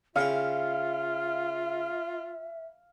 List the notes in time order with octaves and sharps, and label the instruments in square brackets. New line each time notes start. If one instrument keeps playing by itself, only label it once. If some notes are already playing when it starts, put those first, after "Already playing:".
[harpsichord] C#3 E4 G5 [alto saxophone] F4 [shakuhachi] E5 [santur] F5